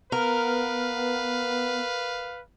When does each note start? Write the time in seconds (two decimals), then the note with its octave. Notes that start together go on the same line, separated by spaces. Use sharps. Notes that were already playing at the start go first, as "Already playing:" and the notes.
0.12 B3 A#4 B4 F5